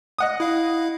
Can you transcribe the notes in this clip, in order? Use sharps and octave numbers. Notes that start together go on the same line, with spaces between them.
D#5 F#5 D#6
E4 F5